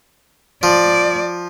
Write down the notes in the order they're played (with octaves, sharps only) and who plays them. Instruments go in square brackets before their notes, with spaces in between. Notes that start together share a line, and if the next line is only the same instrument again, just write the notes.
[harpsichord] F3 [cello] D5